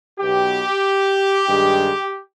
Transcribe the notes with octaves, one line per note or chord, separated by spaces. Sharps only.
B1 B2 F#3 G4
G2 D#3 G#3